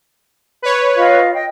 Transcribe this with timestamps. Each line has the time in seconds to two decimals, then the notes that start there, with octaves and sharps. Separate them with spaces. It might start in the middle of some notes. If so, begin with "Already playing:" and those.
0.62 B4 C#5
0.96 F4 D#5 F5
1.33 D#5 G5